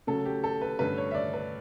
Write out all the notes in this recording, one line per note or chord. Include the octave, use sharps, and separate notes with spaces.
C#3 F#3 A3 C#4 A4
G4
A4
B4
G2 D3 A3 C#4 B4
C#5
E5
D5
B4